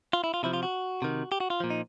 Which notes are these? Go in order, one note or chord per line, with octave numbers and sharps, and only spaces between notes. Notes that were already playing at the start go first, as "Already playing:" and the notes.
F4
E4
F4
C3 F3 E4
F4
F#4
C3 D#3
G4
F#4
F4
A#2 F3
D#4